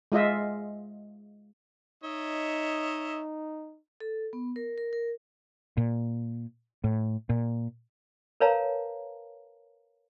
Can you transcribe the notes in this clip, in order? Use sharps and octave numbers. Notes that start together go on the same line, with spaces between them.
G#3 F4 D#5 E5
D#4 C#5 D#5 E5
A4
B3
A#4
A#4
A#4
A#2
A2
A#2
A#4 B4 C#5 F5 A5 A#5